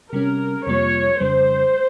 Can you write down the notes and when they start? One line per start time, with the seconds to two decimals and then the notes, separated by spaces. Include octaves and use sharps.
0.13 C3 G3 C#4 A#4
0.67 F2 C3 G3 A#3 F4 C#5
1.20 F2 C#3 G3 C5